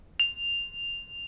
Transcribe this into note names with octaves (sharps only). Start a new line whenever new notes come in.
F7